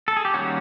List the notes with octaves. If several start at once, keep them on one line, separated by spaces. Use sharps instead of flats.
A4
G#4
G4
D#3 G3 A#3 C#4 F#4